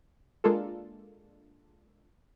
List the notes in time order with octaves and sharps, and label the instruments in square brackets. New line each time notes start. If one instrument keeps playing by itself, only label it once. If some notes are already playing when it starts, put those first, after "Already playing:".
[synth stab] G#3 A#3 D4 F4 A4